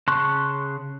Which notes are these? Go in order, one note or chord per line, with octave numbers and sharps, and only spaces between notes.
C#3 A5 C6 C#6 F#6